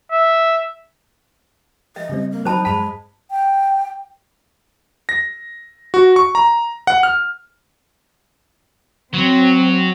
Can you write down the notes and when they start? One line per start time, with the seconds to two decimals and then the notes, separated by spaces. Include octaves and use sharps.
0.12 E5
1.96 D#5 E5
2.09 C#3 G3 C4
2.32 A#3
2.45 F#3 D#4 C5 A5 B5
2.65 G2 G#3 A5 B5 B6
3.31 G5
5.09 A#6
5.94 F#4
6.16 C#6
6.35 A#5
6.87 F#5
7.03 F6
9.14 F#3 C4